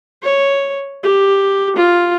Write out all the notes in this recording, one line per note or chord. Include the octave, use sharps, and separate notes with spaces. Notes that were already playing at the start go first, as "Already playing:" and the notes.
C#5
G4
F4